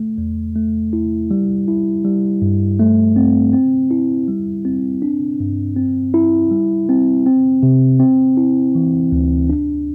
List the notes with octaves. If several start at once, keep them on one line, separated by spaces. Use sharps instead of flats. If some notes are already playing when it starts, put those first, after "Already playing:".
Already playing: A3
E2
A3
E4
G3
E4
G3
G2
A3
C4
C4
E4
G3
C4
D4
G2
C4
E4
G3
C4
C4
C3
C4
E4
E3
D2
D4